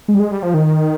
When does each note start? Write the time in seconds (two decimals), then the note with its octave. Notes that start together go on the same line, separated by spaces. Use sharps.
0.08 G#3
0.15 G3
0.20 G#3
0.31 G3
0.43 F3
0.54 D#3